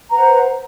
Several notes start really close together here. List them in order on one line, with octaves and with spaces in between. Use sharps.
A#5 B4 F#5 C5